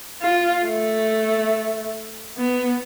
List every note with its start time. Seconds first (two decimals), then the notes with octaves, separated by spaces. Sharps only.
0.22 F4
0.64 A3
2.37 B3